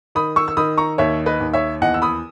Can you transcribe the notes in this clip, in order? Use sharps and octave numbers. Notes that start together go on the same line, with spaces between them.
D#3 B5 D#6
C#6 E6
E6
D#3 B5 D#6
A#5 C#6
D#2 C#5 E5
B4 D#5
D#2
C#5 E5
E2 D#5 F#5
E6
B5 D#6